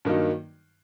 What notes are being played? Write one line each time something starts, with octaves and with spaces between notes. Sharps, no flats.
G2 D#3 F#3 A#3 D#4